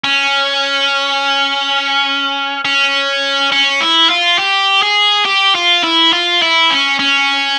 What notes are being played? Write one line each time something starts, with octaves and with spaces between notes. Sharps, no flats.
C#4
C#4
C#4
E4
F4
G4
G#4
G4
F4
E4
F4
E4
C#4
C#4